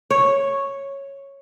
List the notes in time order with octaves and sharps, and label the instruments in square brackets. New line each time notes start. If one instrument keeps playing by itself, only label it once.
[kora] C#5